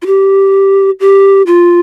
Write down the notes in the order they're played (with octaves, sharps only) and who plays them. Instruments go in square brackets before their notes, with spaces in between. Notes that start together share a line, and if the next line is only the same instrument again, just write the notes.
[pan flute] F4
G4
G4
F4